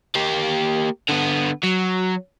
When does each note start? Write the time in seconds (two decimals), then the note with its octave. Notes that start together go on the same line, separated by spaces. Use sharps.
0.15 A#3 G4
1.09 D3 B3
1.64 F#3